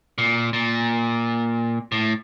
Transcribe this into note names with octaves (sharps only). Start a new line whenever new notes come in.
A#2
A#2
A2